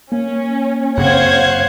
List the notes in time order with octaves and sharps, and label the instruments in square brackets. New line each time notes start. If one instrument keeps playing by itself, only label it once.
[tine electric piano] A#3 [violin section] C#4
[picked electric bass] F#2 C#3 C4 [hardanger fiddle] C5 F#5 [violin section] C#5 F5 G#6